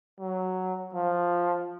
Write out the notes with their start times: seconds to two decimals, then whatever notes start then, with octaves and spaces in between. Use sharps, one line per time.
0.20 F#3
0.95 F3